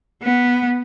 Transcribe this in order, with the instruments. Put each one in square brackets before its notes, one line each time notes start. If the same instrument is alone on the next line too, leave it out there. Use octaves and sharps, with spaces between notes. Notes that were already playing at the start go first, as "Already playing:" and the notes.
[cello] B3